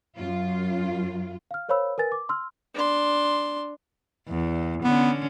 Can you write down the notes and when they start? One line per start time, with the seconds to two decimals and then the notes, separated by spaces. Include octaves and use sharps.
0.17 F#2 F4
1.51 F5 F6
1.69 A#4 C5 C#5 F5 B5 E6
1.98 A#4 B4 G#5 A6
2.12 D6
2.29 C6 E6 F6
2.74 D4 C6
4.29 E2
4.84 D3 B3 C#4